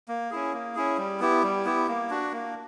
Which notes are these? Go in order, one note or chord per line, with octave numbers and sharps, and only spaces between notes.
A#3
C#4 E4 G#4
A#3
C#4 E4 G#4
G3
B3 E4 G4
G3
B3 E4 G4
A#3
D4 F#4
A#3